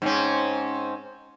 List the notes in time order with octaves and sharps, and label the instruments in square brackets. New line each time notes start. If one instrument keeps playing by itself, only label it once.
[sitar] G#2 C4 C#4